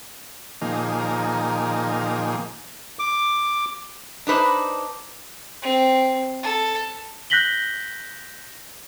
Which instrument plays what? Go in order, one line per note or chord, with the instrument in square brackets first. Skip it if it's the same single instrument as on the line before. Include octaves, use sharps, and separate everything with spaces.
[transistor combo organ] A#2 D#3 F3 A#3 D#4 G#4
[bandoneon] D6
[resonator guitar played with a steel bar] D4 D#4 B4 C5
[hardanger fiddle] C4
A4
[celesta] F#6 G6 A#6 B6 F#7 G7